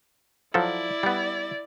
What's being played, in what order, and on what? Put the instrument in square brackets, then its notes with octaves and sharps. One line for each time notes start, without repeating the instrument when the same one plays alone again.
[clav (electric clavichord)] F3 F#3 A4 [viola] E4 D5
[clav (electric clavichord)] G3 B3